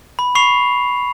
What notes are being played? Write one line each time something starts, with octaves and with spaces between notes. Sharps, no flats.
B5
B5 C#6 C7 F7